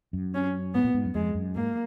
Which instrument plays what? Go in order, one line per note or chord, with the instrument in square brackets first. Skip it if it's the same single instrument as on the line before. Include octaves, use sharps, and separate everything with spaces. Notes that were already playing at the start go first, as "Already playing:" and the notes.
[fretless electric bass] F#2
[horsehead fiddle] C#4
[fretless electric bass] G#2 [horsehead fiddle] B3
[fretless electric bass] A#2
G#2
F#2
[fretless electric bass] F2 [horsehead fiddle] G#3
[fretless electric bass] F#2
[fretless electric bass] G#2 [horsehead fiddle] A#3